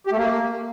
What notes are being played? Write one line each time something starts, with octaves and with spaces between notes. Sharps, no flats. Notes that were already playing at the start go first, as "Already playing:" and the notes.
G4
A3
A#3